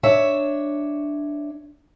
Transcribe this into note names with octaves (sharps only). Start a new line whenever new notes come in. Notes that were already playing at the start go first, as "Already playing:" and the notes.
D4 C#5 E5